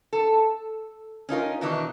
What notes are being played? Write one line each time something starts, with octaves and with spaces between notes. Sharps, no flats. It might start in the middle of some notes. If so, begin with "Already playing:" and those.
A4
C#4 D#4 F4 A#4
B2 D#3 E3 D4 D#4